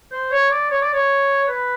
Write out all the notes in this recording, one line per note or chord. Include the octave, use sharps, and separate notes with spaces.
C5
C#5
D5
C#5
D5
C#5
B4